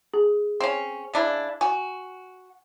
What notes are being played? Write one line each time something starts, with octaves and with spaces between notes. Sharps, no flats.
G#4
C4 C#4
C#3 D4 E4
F#4 G#5